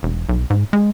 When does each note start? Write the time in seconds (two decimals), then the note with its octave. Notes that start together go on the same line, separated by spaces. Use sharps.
0.03 E1
0.29 B1
0.50 G#2
0.73 G#3